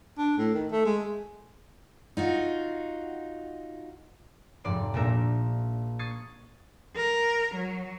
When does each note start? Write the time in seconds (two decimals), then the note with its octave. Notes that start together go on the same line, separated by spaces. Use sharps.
0.18 D4
0.38 A2
0.54 D#3
0.72 A3
0.86 G#3
2.17 D#4 F4 F#4
4.64 F1 G#2 D5 C6
4.94 A#1 A#2 A#3 E5 A#6
5.99 C#6 D#6 G#6 A6 C7 C#7
6.96 A#4
7.55 F#3